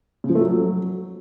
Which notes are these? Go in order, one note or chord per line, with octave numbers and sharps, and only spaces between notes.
C#3
F3
A3
F#3